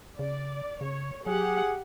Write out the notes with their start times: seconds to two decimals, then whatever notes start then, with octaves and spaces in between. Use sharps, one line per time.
0.19 C#3 D5
0.81 C#3 C#5
1.26 F#3 G4 G#4 F#5